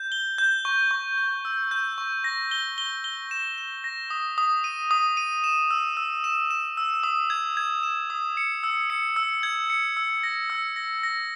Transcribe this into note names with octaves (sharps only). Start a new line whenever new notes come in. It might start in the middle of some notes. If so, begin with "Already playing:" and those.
Already playing: G6
G7
G6
C#6
C#6
G6
E6
G6
C#6
A#6
G7
G7
G7
E7
E7
A#6
D#6
D#6
D#7
D#6
D#7
E7
E6
E6
E7
E7
E6
D#6
G#6
G#6
E7
D#6
C#7
E6
C#7
E6
G#6
C#7
E6
A#6
E6
A#6
A#6